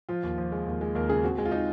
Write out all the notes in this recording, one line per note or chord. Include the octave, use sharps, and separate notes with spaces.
F3 F4
D#2
F3
G#3
D#2
G#3
D#2 A#4
C#3 G#4
C4 F#4
G#3
F4
G#3 D#4